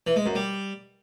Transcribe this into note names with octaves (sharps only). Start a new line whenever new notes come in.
E3
G#3
F#2
G3